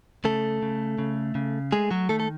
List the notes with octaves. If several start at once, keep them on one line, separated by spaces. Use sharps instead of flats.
C#3 A3 A4
C#3
C#3
C#3
G#3 A3 G#4
F#3 F#4
D#3 A3 A4
A4